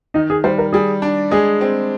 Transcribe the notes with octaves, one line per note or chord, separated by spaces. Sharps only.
D#3 D#4
G#4
G3 C5
A#4
G3 G#4
D4
G#3 G#4
C4